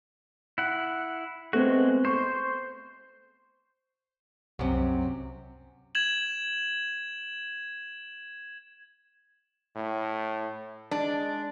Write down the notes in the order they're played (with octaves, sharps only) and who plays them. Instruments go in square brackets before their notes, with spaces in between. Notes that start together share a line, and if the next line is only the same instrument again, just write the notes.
[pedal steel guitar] E4 F#5
[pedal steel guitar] G#3 F#4 [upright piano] A3 B3 C4
[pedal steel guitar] C5 [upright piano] C#6
[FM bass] C2 [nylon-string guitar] F#2 C3
[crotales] G#6 E7 F#7
[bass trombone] A2
[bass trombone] G#3 [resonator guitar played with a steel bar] D4